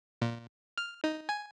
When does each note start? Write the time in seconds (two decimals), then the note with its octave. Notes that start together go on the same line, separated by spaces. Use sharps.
0.22 A#2
0.78 F6
1.04 D#4
1.29 G#5